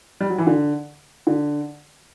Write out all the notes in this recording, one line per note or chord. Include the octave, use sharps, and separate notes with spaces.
G3
F#3
E3
D3
D3